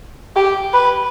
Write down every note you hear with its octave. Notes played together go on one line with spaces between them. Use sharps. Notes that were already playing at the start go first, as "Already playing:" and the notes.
G4
B4